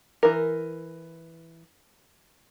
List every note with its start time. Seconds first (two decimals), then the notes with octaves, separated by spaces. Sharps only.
0.23 E3 A#4